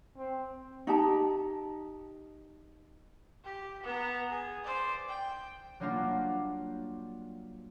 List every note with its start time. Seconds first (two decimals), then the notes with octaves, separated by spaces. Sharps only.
0.17 C4
0.87 D#4 G4 A5
3.45 G4
3.83 B3 A#5
4.30 G#4
4.64 C5 D5
5.08 G5
5.80 F#3 G3 A#3 D4 F4